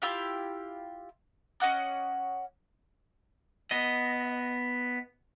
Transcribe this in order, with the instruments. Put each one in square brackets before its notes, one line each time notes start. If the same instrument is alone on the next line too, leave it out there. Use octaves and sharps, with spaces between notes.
[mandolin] E4 F4 G4 F5
C#4 D#5 F#5 D6
[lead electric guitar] B3 D#5